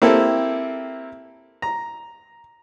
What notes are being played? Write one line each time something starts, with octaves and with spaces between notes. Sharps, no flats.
A#3 C4 E4 G4 A4
A#5